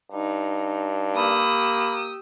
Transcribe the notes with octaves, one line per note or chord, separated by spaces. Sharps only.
G2 D#4
A#3 G4 B5 D#6 E6